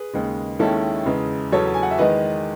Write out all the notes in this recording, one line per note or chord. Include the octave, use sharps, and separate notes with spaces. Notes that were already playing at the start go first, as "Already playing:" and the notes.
Already playing: G#4 B4
D#2 C#3 G#3
D#2 D#3 G#3 C#4 E4 A4
E2 C#3 G#3
E2 C#3 F#3 C#4 A4 C#5
A5
G#5
F#5
E5
E2 D#3 G#3 B4 D#5